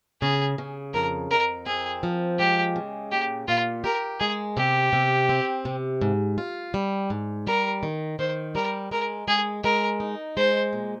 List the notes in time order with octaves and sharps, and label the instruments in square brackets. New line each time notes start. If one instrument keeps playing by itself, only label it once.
[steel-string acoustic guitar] C#3 [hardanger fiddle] G#4
[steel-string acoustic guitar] C#3
[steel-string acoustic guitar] F2 [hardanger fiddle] A#4
[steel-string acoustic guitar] F2 [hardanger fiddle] A#4
[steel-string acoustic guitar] C4 [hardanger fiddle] G#4
[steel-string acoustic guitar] F3
[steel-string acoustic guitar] G#3 [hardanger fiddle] G4
[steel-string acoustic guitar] C#3
[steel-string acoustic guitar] A#2 [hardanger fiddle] G4
[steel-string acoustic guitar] A#2 [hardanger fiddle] F4
[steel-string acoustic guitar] G4 [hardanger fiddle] A#4
[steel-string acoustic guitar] G#3 [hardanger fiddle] G#4
[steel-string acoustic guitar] C3 [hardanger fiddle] G4
[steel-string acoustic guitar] C3
C4
C3
G#2
F4
G3
G#2
[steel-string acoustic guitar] G3 [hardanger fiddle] A#4
[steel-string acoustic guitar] D#3
[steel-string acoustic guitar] D#3 [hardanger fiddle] C5
[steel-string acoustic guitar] G3 [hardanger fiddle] A#4
[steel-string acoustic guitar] G#3 [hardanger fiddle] A#4
[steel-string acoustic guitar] G#3 [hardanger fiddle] G#4
[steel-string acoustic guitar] G#3 [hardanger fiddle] A#4
[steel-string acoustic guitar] D#4
[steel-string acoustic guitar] G#3 [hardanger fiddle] C5
[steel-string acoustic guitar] A#2